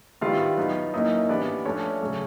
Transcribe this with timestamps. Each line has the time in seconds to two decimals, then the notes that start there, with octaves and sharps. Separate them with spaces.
0.21 D#3 G3 B3 E4 F4 F5
0.57 F#3 B3 D#4
0.94 F#3 A#3 C#4 D#4 E4 D#5
1.29 E3 G3 B3 D4 D5
1.65 F3 A3 C#4 D4 C#5
2.01 C#3 F#3 A3